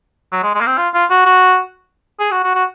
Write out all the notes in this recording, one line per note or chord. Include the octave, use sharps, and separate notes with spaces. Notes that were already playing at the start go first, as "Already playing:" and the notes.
F#3
G#3
G#3
A#3
C4
F4
F4
F#4
F#4
G#4
F#4
F#4
F#4